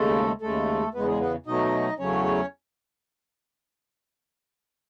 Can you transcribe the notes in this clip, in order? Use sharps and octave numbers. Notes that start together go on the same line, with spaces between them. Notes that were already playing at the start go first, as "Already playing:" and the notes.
Already playing: D#2 C#3 G#3 A3 A4
D#2 C#3 G#3 A3 A4
E2 C#3 G#3 B3 B4
G#3 G#4
B3 B4
B2 F#3 A3 D#4 D#5
E2 C#3 F#3 A3 C#4 C#5